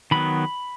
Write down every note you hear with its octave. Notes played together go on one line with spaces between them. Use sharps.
D#3 F#3 B3 B5